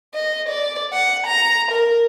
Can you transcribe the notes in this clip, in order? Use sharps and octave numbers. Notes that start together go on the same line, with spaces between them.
D#5
D5
F#5
A#5
A#4